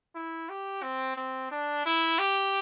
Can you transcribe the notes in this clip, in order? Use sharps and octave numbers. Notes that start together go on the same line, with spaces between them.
E4
G4
C4
C4
D4
E4
G4